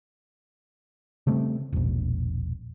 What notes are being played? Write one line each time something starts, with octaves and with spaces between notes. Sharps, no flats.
C#3 G3 A3 C4
E1 A#1